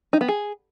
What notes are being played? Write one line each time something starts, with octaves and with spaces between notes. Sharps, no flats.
D#4
B3
G#4